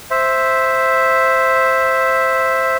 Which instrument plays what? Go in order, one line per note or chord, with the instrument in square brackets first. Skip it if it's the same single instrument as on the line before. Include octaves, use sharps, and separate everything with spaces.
[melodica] C5 E5